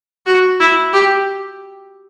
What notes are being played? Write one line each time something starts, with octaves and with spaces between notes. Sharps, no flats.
F#4
E4
G4